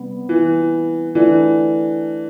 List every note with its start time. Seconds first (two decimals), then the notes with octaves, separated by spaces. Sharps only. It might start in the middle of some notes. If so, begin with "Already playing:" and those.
Already playing: C3 G3 B3
0.29 E3
1.15 D3 E3 A3 D4